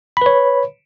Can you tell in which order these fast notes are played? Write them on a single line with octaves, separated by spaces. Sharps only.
B5 B4 C#5